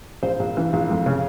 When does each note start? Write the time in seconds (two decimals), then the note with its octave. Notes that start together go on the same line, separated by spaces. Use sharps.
0.23 A#1 C5
0.39 A#1
0.57 E3
0.73 A#1
0.91 F2
1.06 C#3